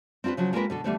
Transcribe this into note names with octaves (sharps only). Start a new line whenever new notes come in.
C4 D4 F4 A#4 B4
C#3 F3 F#3
G#3 A#3 C4 F4 A#4 B4
B2 D3 A4
D3 E3 G3 A3 B3 C4